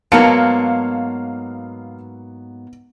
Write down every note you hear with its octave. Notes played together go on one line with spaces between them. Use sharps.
G#2 F#3 A#3 B3 F5 A5 C#7